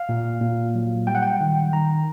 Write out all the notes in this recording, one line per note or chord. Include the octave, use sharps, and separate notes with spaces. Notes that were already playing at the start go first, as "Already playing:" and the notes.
Already playing: F5
A#2
A#2
F#3
G3 G5
F#5
G5
D#3
D#3 A#5